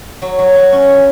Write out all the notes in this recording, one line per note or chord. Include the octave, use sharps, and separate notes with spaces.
F#3
F#3
F#3
C#4
E3